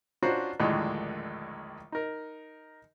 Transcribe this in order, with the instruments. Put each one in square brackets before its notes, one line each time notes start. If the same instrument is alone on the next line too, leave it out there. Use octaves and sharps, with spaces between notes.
[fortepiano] C#4 D4 F4 F#4 C5 A#5
A#1 D#2 A2 D3 D#3 G#3
D#4 A#4